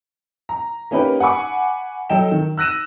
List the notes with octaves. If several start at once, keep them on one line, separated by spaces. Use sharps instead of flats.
A#5
A#3 C#4 D#4 G4 A#4 B4
F#5 G#5 B5 C#6 D6
F#3 A4 D#5 G5 E7
D#3
E6 F#6 A#6 D#7 E7